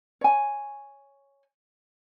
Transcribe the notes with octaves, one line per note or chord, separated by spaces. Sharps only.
C#5 G#5